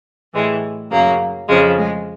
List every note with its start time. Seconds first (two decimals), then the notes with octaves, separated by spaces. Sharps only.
0.33 A2 E3 G3 G#3
0.91 F#2 C#3 F#3 A#3
1.48 F2 C#3 F3 G#3
1.78 G#3